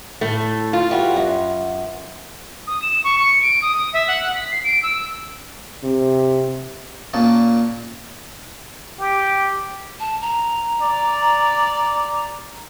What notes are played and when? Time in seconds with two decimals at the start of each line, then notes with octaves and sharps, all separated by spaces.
0.21 A2 A3
0.73 F4
0.90 E3 G3 F#4
1.16 F#2
2.67 D#6
2.82 E7
3.04 C#6
3.19 C#7
3.42 D7
3.62 D#6
3.93 E5
4.08 F#5
4.35 B6
4.51 C7
4.64 D7
4.83 E6
5.83 C3
7.14 A#2 A#3 C#4 A5
8.99 G4
10.00 A5
10.21 A#5
10.82 D5